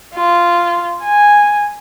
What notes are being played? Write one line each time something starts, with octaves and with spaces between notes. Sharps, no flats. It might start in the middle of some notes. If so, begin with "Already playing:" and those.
F4
G#5